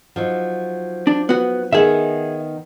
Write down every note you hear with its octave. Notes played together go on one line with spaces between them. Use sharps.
F3 F#3 D#4
D4
B3 F#4
D#3 B3 G#4 E5